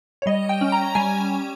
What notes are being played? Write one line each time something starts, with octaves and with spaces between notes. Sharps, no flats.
C#5
G3 D#5
G5
C#4
A#5
G3 G#5